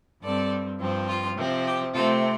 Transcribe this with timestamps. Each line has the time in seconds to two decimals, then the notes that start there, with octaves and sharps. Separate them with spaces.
0.21 G2 G3 C4 A4 D5
0.79 G2 F3 C4
1.08 F4
1.37 C3 F3 C4
1.66 G4
1.94 C3 A3 C4 F4 A4